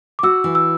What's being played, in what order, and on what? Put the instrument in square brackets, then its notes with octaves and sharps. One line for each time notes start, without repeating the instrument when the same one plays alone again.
[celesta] D6
[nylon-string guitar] F#4 [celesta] E6
[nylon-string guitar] E3
[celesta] E6